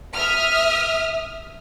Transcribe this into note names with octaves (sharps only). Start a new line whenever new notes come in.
E5 D#6 F6